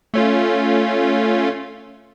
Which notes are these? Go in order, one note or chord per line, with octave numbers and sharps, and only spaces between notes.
A3 C#4 F4